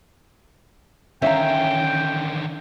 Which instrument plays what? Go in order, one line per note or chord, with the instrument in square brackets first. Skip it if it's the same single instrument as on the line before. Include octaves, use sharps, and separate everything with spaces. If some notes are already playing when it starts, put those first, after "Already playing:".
[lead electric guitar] D3 D#3 [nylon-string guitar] C#4 [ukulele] E5 F5 A#5 [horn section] G5